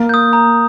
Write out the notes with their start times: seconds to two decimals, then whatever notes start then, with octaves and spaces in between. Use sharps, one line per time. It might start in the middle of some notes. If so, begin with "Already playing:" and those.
Already playing: A#3
0.09 D#6 G6
0.33 A#5